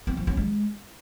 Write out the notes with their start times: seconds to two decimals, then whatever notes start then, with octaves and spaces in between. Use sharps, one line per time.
0.07 C4
0.17 F3
0.27 C#4
0.37 G#3